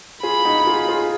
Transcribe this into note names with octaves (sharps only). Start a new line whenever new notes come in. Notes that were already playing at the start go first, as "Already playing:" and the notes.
F4 G#4 B5
D#4 F#4
F4 G#4
F4 G#4